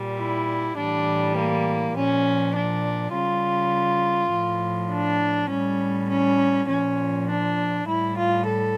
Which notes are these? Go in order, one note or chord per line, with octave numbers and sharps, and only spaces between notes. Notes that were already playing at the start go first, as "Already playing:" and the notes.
Already playing: A#2 G3
E4
A2 E3 G3 D4
A#3
A#2 F3 C#4
D4
C#3 G3 F4
A2 F3
D4
A2 G3 C#4
C#4
A#2 F3 C#4
D4
A2 G3 E4
F4
A4